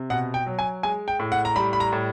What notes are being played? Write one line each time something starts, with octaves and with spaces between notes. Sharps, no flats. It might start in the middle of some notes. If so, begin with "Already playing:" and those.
Already playing: C3
B2 F#5
G5
F#3
G#5
G#3 G#5
G5
A2
F#5
A#5
G3 B5
B5
A#5
A2